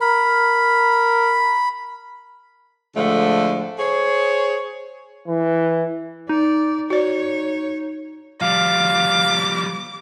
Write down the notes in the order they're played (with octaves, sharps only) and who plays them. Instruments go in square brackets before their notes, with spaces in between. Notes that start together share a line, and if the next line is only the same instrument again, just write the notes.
[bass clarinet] A#4 [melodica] B5
[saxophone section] A2 D3 F3 G#3 A3
G#4 C5 C#5
[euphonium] E3
[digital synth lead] D#4 [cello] D5
[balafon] F#4 D5 [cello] C#5
[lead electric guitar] F3 G3 [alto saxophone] F5 [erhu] D6